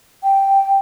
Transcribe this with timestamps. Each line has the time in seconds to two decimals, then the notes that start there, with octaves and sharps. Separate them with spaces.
0.23 G5